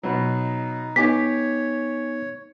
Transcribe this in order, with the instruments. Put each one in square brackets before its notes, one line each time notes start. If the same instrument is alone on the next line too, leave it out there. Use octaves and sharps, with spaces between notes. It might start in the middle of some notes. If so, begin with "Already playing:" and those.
[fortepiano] B2 F#3 [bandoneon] D#4
[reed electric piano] B3 D#4 [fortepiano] G4 G#5 D6 [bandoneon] C#5 [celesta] B6